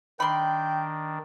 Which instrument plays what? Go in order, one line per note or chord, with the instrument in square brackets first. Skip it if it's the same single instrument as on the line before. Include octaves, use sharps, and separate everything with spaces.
[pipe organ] D#3 D4 [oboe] G5 [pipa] B5 C6